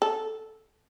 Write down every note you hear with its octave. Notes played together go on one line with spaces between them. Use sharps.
A4